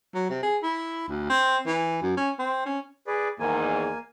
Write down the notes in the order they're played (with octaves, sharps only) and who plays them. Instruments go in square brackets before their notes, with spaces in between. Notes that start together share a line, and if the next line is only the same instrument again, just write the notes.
[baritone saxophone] F#3
C3
G#4
E4
D2
C4
E3
F#2
C#4
C4
C#4
[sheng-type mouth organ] G#4 B4 D5
[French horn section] E2 G#2 D#3 [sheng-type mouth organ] A#3 G#5